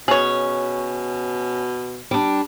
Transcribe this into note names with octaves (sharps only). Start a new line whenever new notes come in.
B2 C#4 G#4 C#5
G3 D4